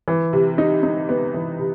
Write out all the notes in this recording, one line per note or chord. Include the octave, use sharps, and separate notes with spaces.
E3
C3
D#4
D#4
B3
E3
C3